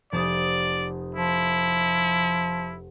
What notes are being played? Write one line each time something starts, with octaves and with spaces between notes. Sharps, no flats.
F1 D5 A5 D#6
F3 E4